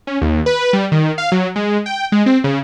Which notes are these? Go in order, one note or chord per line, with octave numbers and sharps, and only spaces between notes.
C#4
D#2
B4
G3
D#3
F5
F#3
G#3
G5
G#3
C4
C#3